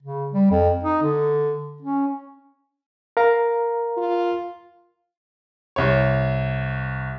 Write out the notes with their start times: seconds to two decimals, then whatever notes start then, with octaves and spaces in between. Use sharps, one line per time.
0.03 C#3
0.32 G3
0.51 F2
0.84 D#4
1.03 D3
1.82 C#4
3.17 A#4 F5 A#5
3.97 F4
5.76 C2 C#5